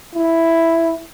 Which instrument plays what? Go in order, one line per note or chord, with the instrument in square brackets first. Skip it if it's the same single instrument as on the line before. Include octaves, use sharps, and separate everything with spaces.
[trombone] E4